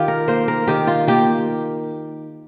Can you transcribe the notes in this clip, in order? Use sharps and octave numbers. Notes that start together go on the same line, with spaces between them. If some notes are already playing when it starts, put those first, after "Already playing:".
Already playing: D#3 D#4 F4 G4
A#4
A#3 C5
A#4
D#3 G4
F4
A#3 G4